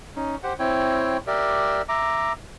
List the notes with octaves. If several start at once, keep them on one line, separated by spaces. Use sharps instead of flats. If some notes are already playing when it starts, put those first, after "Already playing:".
C#4 D#4
G4 C5 F#5
C4 E4 C#5 G5
G4 A#4 D5 E5
E5 A#5 D6